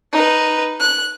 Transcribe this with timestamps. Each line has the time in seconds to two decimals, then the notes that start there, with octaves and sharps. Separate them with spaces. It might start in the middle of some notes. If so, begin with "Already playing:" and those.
0.12 D#4 B4
0.80 F#6